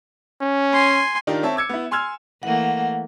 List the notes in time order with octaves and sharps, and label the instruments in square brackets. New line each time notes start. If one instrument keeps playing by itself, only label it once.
[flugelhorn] C#4
[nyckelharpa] G#5 C6
[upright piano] D#3 D4 D#4 F4 G4 A#4
C4 C#5 E5 A5
D6 E6 G#6 C#7
B3 E4
G#5 C6 E6 F6 G#6 F7
[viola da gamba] E3 A3 A#3 [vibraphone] F#5